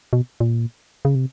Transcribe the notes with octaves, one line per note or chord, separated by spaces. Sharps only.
B2
A#2
C#3
C3